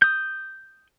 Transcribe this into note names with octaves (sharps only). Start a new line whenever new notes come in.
D#6 G6